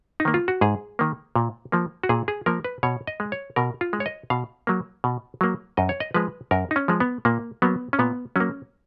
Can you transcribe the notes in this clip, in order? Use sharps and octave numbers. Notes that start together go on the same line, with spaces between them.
D#4
D#3 A#3
F4
F#4
G#2 G#4
D#3 A#3
A#2
F3 A#3
F#4
A#2 G#4
G#4
F3 A#3 A#4
B4
B2 C#5
D#5
G#3
C#5
B2 A#4
F4
G#3
C#5
D#5
B2 F5
F#3 A#3
B2
F#3 A#3
F#2 D#5
C#5
D#5
F3 G#3 B4
F#2 A#4
D#4
C#4
F3 G#3
B3
A#2 A#3
F#3 A#3 B3
C#4
A#2 B3
F#3 A#3 C#4